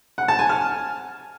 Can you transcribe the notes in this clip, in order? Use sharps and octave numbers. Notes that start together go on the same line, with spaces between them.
F#5
A5
G#5
F6